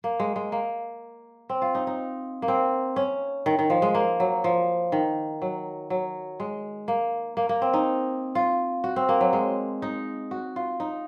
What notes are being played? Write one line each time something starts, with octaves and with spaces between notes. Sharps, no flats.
A#3
G#3
G#3
A#3
C4
F4
D#4
D#4
A#3
C4
C#4
D#3
D#3
F3
G#3
A#3
F#3
F3
D#3
F#3
F#3
G#3
A#3
A#3
A#3
C4
D#4
F4
F#4
C4
A#3
F#3
G#3
D#4
F#4
F4
D#4